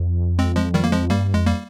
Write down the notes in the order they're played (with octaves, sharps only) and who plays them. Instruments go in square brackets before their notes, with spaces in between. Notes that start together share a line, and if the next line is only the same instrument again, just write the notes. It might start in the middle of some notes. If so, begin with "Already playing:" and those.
Already playing: [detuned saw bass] F2
[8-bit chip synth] G#3 C4
F3 G#3
D#3 G3
A#3
F3 G#3
[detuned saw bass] G2 [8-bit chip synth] G3 A#3
[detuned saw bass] F2 [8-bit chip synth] G#3
[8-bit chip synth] G3 A#3